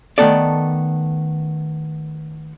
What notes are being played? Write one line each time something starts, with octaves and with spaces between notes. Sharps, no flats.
D#3 E3 A3 B3 A4 D5